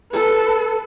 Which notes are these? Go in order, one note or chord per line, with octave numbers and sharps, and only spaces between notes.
A4 B4